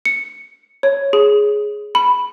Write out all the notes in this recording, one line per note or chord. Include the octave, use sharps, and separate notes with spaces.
C#7
C#5
G#4
B5